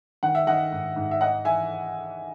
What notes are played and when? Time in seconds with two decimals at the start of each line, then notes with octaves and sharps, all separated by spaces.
0.23 D#3 F#5
0.35 E5
0.47 D#3 D#5 F#5
0.72 G#2
0.96 G#2
1.11 E5
1.21 D#4 D#5 F#5
1.45 E3 E5 G#5